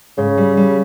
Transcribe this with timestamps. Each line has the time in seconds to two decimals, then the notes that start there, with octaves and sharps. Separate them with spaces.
0.18 G#2 C#3
0.38 G3
0.57 G3